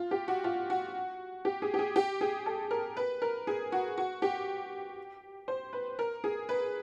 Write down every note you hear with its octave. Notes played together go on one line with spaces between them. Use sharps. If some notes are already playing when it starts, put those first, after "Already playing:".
Already playing: F4
G4
F#4
F4
F#4
G4
G#4
G4
G#4
G4
G#4
A4
A#4
B4
A#4
G#4
F#4
F#4
G4
C5
B4
A#4
G#4
B4